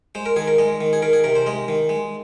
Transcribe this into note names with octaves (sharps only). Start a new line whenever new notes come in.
G#3 C5
A#4
D#3 G#4
A#4
G#3 D#5
D#3
G#4
D#3 A#4
G#4
C3 A#4
C5
G#3 D#5
D#3
G#3